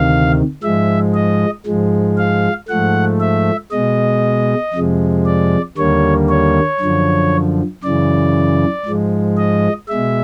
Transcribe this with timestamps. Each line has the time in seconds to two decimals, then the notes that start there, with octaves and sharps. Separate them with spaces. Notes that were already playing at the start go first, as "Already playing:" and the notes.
Already playing: D2 C3 D#3 F5
0.63 G#2 F3 G#3 E5
1.14 D#5
1.66 G#2 F3 G#3
2.18 F5
2.69 G#2 F3 A3 F#5
3.20 E5
3.71 B2 G#3 D#5
4.74 F2 C3 F3 G#3
5.26 D5
5.77 D#2 D3 G3 A#3 C#5
6.29 C#5
6.80 F#2 D3 F3
7.83 F#2 C#3 E3 D5
8.86 G#2 F3 G#3
9.37 D#5
9.88 B2 G#3 E5